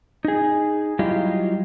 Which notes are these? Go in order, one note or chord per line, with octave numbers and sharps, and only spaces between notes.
D#4 G#4
F#3 G3 E4 F4 G4 D#5